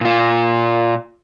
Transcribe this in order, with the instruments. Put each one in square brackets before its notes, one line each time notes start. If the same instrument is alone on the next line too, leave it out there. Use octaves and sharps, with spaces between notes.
[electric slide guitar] A#2 F4